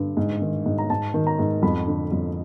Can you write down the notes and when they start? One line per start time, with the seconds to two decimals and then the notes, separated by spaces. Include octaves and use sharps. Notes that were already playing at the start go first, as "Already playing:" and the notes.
Already playing: G2 D3
0.17 G#2
0.42 D#3
0.66 G#2
0.78 A#5
0.90 G#2 A5
1.14 D#3
1.27 A#5
1.39 G#2
1.63 F2 B5
1.87 D3
2.12 F2